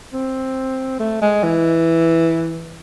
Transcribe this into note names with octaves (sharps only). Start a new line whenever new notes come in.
C4
A3
G#3
E3